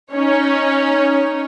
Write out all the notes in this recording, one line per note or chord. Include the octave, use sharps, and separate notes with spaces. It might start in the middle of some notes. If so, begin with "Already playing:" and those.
C#4 D#4 C#5